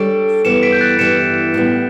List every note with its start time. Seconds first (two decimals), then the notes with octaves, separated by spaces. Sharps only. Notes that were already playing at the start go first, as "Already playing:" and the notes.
Already playing: G3 D4 A4 C#5 D7
0.45 G2 E3 G3 B3 C#7 E7
0.63 B6 D7
0.72 G6
0.81 F#6 A6
0.99 G2 E3 G3 B3 C#7 E7
1.54 A2 G3 B3